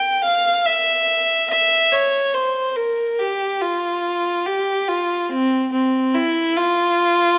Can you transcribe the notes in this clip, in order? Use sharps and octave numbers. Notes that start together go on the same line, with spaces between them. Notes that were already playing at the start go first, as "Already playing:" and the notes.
Already playing: G5
F5
E5
E5
C#5
C5
A#4
G4
F4
G4
F4
C4
C4
E4
F4